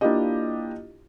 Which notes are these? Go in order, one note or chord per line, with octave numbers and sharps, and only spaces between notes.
A#3 D4 E4 F4 G4 D#5